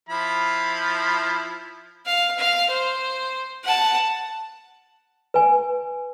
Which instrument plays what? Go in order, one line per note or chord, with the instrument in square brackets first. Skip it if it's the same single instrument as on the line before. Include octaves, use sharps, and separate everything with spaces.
[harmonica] F3 E4 B5
[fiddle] F5
F5
C5
F#5 A5
[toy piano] B4 G#5